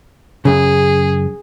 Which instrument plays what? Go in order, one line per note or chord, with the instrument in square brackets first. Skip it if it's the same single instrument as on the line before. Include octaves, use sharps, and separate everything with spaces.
[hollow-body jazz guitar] F#2 C#3 [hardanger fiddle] G#4